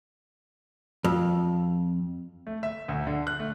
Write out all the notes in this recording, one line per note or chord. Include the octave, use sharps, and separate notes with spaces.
F2
A3
E5
D2
D3
F#6
A3